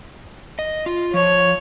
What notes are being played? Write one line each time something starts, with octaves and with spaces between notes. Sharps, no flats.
D#5
F4
F3 C#5